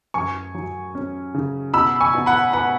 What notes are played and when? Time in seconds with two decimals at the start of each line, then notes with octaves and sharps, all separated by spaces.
0.14 F#2 G#5 C#6
0.55 F#3
0.95 C#4
1.34 C#3
1.73 B2 B5 E6
2.01 G#5 C#6
2.14 B2
2.26 F#5 B5
2.53 B3 F#5 B5